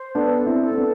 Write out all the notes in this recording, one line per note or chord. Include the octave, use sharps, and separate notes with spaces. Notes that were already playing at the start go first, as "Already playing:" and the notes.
Already playing: C5
B3 D4 A4
C4 E4
A4
C4
B3 D4